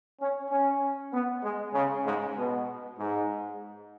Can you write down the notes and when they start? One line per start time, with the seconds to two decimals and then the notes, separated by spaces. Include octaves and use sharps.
0.20 C#4
0.51 C#4
1.12 B3
1.43 G#3
1.74 C#3
2.05 G#2
2.36 B2
2.98 G#2